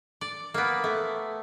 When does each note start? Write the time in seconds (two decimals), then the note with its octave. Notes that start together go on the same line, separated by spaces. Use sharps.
0.21 D5
0.54 A#3 B3
0.84 A3